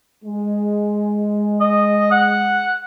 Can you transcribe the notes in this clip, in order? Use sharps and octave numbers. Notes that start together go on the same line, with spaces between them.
G#3
D#5
F#5